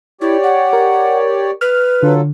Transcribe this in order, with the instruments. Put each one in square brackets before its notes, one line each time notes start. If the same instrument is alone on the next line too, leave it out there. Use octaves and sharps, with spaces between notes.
[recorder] E4 [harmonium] G4 C#5 D5
[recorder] F#5
[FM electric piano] A#4
[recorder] B4 [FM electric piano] F6
[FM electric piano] D3 [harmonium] F#3 F4 A4